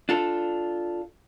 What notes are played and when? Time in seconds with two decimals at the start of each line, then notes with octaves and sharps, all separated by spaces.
0.09 D4 F4 A4